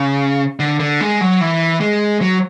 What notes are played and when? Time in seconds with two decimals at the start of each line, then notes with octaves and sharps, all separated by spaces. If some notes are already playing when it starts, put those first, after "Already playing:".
Already playing: C#3
0.60 D3
0.80 D3
1.01 G#3
1.21 F#3
1.41 E3
1.81 G#3
2.21 F#3